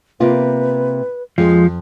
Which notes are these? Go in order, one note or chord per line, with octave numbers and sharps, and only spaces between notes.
C3 A#3 F4 B4
F2 F3 G#3